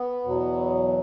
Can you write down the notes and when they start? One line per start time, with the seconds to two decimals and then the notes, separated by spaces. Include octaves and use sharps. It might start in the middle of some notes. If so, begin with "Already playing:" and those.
Already playing: B3
0.24 E2 B2 F#3